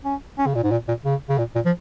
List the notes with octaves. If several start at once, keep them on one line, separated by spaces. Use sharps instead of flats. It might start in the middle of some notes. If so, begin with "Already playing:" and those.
C#4
C#4
C#3
A#2
G#2
A#2
A#2
C#3
C#3
A#2
A#2
F3